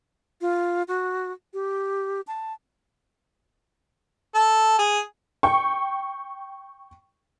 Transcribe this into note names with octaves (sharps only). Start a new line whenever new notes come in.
F4
F#4
G4
A5
A4
G#4
G5 C#6